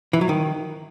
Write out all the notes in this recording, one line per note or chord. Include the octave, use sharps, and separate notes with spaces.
E3
F#3
D#3